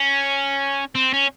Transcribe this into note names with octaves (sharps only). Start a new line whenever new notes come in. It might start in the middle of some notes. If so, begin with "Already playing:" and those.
Already playing: C#4
C4
C#4